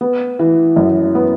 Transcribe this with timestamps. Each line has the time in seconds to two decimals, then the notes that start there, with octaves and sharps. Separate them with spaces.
0.01 B3
0.39 E3
0.76 F#2
1.15 B3